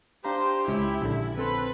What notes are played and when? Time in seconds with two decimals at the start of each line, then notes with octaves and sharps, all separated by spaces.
0.25 D4 G4 C5 F5 A#5
0.68 C#2 C#4 E4
1.02 A#1 D3
1.38 C4 A4 B4 C6